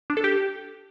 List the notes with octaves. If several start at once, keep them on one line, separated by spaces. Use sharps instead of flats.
D4
A4
G4